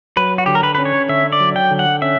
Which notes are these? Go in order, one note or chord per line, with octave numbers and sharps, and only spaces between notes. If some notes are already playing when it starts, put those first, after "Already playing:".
F#3 B4
F#4
D3 G4
A#4
B4
C#4 B4
C#5
D3 E5
D5
F#3
G5
D3
F#5
C#4 E5